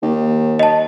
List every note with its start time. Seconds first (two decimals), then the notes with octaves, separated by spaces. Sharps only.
0.02 D#2
0.59 D#5 A5